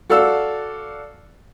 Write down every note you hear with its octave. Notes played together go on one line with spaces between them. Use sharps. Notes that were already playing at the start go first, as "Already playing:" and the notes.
F#4 A4 D5 F5 E6